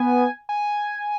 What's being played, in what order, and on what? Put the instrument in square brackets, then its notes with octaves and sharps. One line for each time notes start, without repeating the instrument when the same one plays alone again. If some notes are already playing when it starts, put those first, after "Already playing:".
Already playing: [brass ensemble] B3 [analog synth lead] G#5
[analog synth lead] G#5